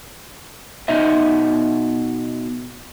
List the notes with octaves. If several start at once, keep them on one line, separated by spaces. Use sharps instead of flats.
B2 D#4 D#5 E5